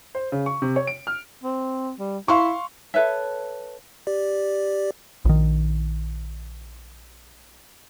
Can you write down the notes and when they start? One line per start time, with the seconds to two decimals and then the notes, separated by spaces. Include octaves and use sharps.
0.15 C5
0.32 C#3
0.46 C#6
0.62 C3
0.76 C#5
0.87 D7
1.07 F6
1.44 C4
1.99 G3
2.28 E4 F5 C6 C#6
2.94 A4 B4 C#5 E5
4.07 G4 D5
5.25 A#1 D#3